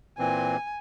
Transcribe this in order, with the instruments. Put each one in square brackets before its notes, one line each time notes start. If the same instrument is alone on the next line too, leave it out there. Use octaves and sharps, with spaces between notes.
[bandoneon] A#2 E3 C4 [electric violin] G#5